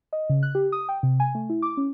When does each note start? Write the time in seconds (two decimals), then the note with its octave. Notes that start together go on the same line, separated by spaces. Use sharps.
0.13 D#5
0.30 C#3
0.43 F#6
0.55 G4
0.72 D#6
0.89 G5
1.03 C3
1.20 G#5
1.35 A3
1.50 E4
1.62 D6
1.77 C#4